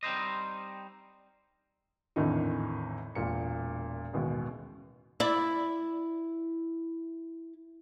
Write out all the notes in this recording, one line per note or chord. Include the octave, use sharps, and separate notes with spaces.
G3 C4 D#4 C5 D#5
G#1 E2 A2 D3 D#3 D#4
E1 A#2 C#7
A1 D#2 B2 G#3
E4 D5